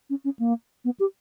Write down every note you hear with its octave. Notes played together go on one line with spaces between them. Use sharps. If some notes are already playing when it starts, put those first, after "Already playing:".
C#4
C#4
A#3
B3
G4